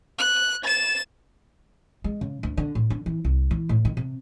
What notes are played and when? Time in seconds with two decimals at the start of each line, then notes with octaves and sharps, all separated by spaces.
0.18 F#6
0.64 A6 E7
2.04 G#3
2.21 C#3
2.43 D2
2.57 D3
2.75 A2
2.90 D3
3.06 E3
3.25 C2
3.51 E3
3.69 A2
3.85 D#3
3.97 C3